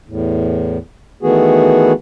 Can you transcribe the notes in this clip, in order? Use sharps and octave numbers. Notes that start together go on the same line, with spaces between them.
E2 A2
D#3 E3 A3 B3 F#4 G#4